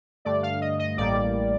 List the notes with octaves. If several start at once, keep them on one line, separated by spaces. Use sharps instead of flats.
G2 D3 A3 D5
F5
D#5
D#5
A1 A2 G3 A#3 D5